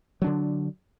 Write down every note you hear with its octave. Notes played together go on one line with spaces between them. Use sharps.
D3 F#3 D4